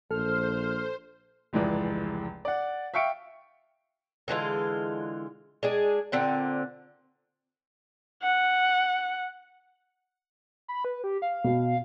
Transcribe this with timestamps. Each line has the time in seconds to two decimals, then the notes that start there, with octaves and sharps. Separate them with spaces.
0.11 A#1 A4 C5 F6
1.53 F1 C#2 E3 G#3 D5
2.45 D5 F#5
2.94 E5 F5 G5 C#6 C#7 D7
4.28 D3 E3 G#3 F4
5.63 G#3 D4 G#4
6.12 A#2 D3 C4 F#5
8.22 F#5
10.68 B5
10.85 B4
11.04 G4
11.22 F5
11.44 B2